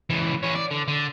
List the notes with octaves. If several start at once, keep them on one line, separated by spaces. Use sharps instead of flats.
C#2 E3
E3 C#5
D5
D3
D3